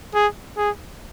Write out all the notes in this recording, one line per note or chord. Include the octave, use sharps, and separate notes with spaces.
G#4
G#4